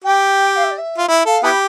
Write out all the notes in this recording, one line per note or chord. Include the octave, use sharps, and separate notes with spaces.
G4 G5
F5
E5
D5
E5
F4
E4 E5
A4 F5
B3 E4 G4 B5